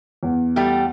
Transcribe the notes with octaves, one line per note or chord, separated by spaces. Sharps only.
E2
G3 A3 G4